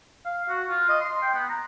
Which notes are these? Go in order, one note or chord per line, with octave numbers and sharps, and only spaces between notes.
F5
F#4
F4
D#5
C6
G5
B3
A#5